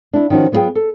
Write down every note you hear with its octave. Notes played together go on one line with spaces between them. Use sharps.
D4 E4
D#3 F3 C#4 D#4 F#4
F#3 B3 D#4 F4 G#4 G5
A4